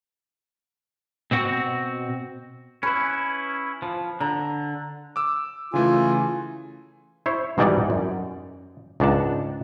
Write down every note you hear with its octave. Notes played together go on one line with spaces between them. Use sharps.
B2 C4 F#4
C#4 E4 B4
F3
D3 A#5
D6 E6
C#3 E3 A3 F4 G#5
E4 C5 C#5
G#2 B2 E3 G3 D#4 D5
F#2
C#2 G#2 D4 F#5 A5